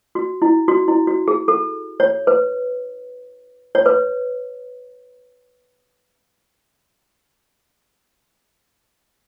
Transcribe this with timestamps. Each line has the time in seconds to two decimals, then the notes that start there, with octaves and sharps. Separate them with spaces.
0.15 F#4
0.42 E4
0.68 F#4
0.88 E4
1.07 F#4
1.28 G#4
1.48 A4
2.00 C#5
2.27 B4
3.75 C#5
3.86 B4